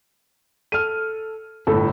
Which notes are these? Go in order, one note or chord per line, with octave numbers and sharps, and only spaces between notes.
A4 F6 D#7
G1 A2 A4